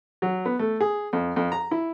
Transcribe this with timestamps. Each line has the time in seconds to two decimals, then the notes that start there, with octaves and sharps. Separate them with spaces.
0.22 F#3
0.45 B3
0.59 A3
0.81 G#4
1.13 F2
1.36 F2
1.52 A#5
1.71 E4